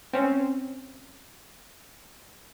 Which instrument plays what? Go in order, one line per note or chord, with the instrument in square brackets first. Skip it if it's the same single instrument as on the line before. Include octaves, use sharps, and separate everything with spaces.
[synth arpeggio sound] C4 C#4